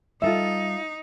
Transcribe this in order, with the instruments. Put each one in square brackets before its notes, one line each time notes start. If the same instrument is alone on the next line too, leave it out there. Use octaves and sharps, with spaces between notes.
[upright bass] G3 [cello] D#4 [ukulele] F4 A4 E5